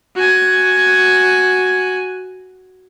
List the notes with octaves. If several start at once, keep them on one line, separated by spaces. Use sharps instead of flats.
F#4 G#5